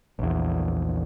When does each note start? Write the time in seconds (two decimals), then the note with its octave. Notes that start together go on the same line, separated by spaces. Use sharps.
0.19 A#1 E2